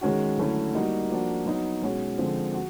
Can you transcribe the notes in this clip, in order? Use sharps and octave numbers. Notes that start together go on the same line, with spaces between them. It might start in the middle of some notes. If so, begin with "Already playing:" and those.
D#3 G#3 C#4 F#4
D3 F#3 A3 C#4 E4
G3 A#3 D#4 F#4
F3 A#3 D4 F#4
F#3 B3 D#4
B2 G#3 C#4 F#4
D3 F3 G#3 C4
F#4